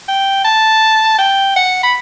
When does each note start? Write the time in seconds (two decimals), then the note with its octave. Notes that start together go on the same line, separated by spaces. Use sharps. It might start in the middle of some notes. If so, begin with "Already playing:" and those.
0.08 G5
0.44 A5
1.19 G5
1.56 F#5
1.83 B5